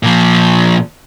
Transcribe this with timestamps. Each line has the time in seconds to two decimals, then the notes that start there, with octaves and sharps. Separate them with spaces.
0.03 A#2 F3